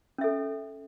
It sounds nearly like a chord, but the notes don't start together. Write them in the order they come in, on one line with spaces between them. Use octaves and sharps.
C#4 E5 A4